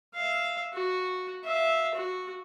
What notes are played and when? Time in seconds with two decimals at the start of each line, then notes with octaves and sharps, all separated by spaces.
0.14 E5 F5
0.73 F#4
1.44 E5 F5
1.95 F#4